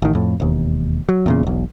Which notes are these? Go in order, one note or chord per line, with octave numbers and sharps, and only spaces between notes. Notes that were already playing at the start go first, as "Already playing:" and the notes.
A1 D#3
F2 A2
E1 D#2
F#3
E2 A#2 C#3
E1 B1